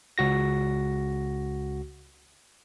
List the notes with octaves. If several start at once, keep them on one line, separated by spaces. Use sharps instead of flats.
C#2 F#4 A#6